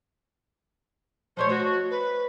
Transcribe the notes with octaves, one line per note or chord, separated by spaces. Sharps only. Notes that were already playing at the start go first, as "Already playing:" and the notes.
F3 A3 C5 C#5
F#4 C5 C#5 D#5
B4